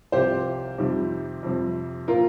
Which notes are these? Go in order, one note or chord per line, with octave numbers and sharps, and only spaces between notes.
C2 C3 F3 G4 C5
F2 C3 D#3 G3
F2 C3 G3
A#2 F3 F4 A#4